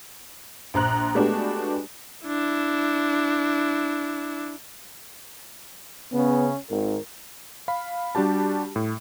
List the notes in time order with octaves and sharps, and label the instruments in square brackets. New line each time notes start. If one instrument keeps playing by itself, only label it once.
[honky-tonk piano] A#1 C5 A#5 F#6
G#3 A3 B3 D4 F#4 G4
[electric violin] D4 E4
[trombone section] C#3 C#4 [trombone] B3
[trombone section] G#1 [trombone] A#4
[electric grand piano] F5 B5
G3 D4 F#4 G4 A5
A2